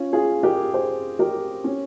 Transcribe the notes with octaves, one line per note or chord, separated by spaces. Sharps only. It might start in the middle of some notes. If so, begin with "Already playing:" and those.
Already playing: C#4 F4
F4 G#4
G4 A#4
G#4 C5
G4 A#4
C#4